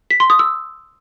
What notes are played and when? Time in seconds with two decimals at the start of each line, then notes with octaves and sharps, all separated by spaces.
0.10 B6
0.20 C6
0.30 D#6
0.39 E6